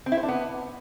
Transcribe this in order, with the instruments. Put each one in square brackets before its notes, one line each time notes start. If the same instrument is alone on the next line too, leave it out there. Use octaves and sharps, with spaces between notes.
[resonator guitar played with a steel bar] C4
E4
C5
D4
B3